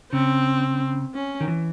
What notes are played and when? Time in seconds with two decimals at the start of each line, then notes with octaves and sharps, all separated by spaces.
0.12 C#3 C4
1.14 C#4
1.40 D#3
1.48 E3